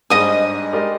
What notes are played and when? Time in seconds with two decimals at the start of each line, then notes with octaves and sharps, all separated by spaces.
0.10 G#2 G3 D4 G#4 C5 D#5 D#6
0.73 G#3 D#4 G4 A#4 D5